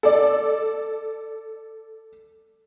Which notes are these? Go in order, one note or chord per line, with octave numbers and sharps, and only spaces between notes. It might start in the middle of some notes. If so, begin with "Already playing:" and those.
A4 D5